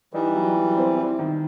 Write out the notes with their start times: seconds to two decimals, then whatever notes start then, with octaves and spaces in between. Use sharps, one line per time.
0.13 E3 G3 D#4
0.35 F#3
0.56 F#3
0.77 C4
0.97 E4
1.19 D#3